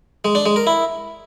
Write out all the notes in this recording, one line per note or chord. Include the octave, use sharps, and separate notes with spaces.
G#3
D4
G#3
A#4
E4